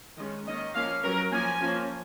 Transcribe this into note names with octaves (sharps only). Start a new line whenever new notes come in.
D#3 G#3 C#4 D#5
D#3 A#3 C#4 D#5
F3 A#3 C#4 F5
F#3 C#4 A#4
F3 A#3 C#4 G#5
F3 A#3 C#4